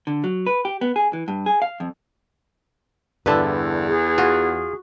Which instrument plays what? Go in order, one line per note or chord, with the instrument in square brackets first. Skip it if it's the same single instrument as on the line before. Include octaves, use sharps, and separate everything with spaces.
[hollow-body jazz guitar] D3
F#3
B4
G4
B3
G#4
E3
G2
G#4
F5
F2
[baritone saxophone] E2 [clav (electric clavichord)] G2 D3 [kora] E4 A4 B4
[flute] G#4
[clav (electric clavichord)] F4 [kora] F#4